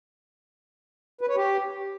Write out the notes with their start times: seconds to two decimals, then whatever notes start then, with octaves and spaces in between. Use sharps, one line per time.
1.21 B4
1.29 C#5
1.36 G4